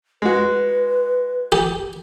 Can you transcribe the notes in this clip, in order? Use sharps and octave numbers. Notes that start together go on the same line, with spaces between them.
G#3 F#4 B4
G4